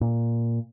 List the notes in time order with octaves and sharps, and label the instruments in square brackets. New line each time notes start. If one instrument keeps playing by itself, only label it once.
[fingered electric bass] A#2